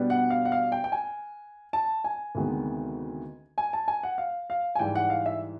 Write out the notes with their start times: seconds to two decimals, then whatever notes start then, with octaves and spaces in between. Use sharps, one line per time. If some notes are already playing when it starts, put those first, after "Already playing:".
Already playing: B2 G3 B3 D4
0.10 F#5
0.30 F5
0.45 F#5
0.52 F5
0.72 G5
0.84 G5
0.92 G#5
1.73 A5
2.04 G#5
2.35 D2 C3 D#3 G#3 B3
3.58 G#5
3.73 A5
3.88 G#5
4.03 F#5
4.18 F5
4.50 F5
4.75 G#5
4.79 G#2 E3 G3 G5
4.95 F#5
5.10 F5
5.26 E5